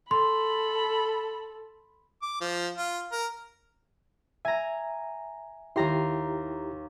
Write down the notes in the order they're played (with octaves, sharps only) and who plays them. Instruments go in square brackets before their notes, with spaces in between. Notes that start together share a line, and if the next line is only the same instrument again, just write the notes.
[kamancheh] A4 [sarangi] B5 [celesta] C6
[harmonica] D6
F3
F4
A#4
[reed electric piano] E5 [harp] G#5 A#5
[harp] D#2 A#5 C6 [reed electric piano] E4 G4